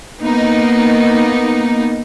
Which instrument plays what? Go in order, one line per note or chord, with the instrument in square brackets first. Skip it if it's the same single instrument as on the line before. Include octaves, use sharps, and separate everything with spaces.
[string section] A#3 B3 D#4